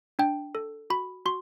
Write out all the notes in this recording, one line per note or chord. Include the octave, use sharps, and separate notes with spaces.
D4 G5
A4
F#4 B5
F#4 C6